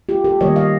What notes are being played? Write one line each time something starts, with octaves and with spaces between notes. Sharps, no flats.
F4 G4
G4 A4
D#3 G3 A#3 C#5 D#5
D#5 F5